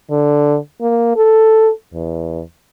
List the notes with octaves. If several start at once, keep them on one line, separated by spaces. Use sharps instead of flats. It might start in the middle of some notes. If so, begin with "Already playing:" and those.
D3
A#3
A4
E2